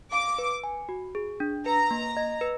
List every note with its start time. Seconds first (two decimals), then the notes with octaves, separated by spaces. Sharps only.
0.12 F5 D6
0.38 B4
0.64 G#5
0.89 F#4
1.15 G#4
1.40 D4
1.66 B4 A#5
1.91 A#3
2.17 D#5
2.41 B4